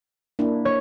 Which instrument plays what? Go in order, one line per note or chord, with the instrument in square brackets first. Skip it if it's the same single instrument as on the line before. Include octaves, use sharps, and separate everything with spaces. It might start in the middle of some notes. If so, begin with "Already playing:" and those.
[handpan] A#3 D4 E4
[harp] C#5